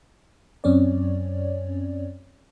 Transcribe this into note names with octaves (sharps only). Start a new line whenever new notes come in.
F#2 C4 C#4 C#5 D5